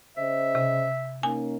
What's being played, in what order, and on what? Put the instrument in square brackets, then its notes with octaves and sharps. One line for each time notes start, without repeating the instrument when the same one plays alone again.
[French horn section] C#3 C5 D#5 [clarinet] E5
[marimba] C3
[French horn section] A#3 C#4 D#4 [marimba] G#5